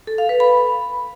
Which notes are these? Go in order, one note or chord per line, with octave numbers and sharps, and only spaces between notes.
A4
F5
B4
B5